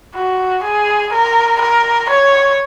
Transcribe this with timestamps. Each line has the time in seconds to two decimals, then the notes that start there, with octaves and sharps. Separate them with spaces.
0.16 F#4
0.64 G#4
1.12 A#4
1.61 A#4
2.10 C#5